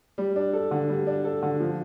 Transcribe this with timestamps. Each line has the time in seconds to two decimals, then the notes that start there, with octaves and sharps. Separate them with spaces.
0.18 G3
0.36 D4
0.53 A4
0.71 D3
0.89 G3
1.07 D4
1.25 A4
1.43 D3
1.60 F3